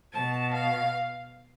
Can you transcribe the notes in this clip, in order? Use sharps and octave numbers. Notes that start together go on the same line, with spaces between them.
B2 A5
F5